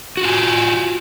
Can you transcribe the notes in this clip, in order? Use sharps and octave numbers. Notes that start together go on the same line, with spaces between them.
F4 F#4 G#5